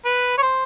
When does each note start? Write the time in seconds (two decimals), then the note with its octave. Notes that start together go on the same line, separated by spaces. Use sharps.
0.05 B4
0.38 C#5
0.42 C5